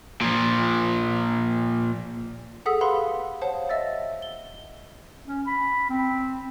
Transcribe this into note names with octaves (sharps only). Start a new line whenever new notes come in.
A#2 F3
G#4 A4 F#5 D#6 E6 B6
G4 B4 F5 F#5 B5 C6
C5 C#5 F5 F#5 A5
D#5 E5 E6 A6
G7
C#4
B5
C4